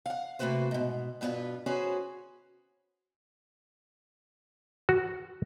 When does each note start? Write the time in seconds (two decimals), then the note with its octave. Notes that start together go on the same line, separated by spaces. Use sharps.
0.06 F5 F#5
0.39 C3 A3 A#3 F#4 B4 C5
0.71 G#2 B2
1.21 G2 B2 B3 F4 B4
1.66 C#4 F#4 G#4 B4 C5
4.89 F#4